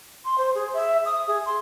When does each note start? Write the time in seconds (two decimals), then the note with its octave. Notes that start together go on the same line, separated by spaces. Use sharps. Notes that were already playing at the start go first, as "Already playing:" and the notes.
0.25 C6
0.38 C5
0.55 G#4
0.74 E5
1.05 D#6
1.27 G#4
1.46 C6